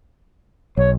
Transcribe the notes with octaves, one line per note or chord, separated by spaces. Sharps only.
B1 C#5